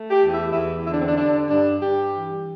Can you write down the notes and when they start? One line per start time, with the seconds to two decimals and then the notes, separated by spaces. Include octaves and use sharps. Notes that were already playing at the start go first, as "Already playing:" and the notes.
Already playing: A3
0.11 G4
0.21 E2
0.32 E4
0.53 E2 E4
0.85 D3 E4
0.93 D4
1.00 C4
1.07 D4
1.17 G3 D4
1.49 G2 D4
1.82 G2 G4
2.14 E3